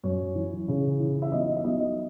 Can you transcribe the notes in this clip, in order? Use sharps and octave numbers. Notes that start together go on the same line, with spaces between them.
F#2 C#5
E3
C#3
E3
E5
B1 D#5
E5
B1 D#5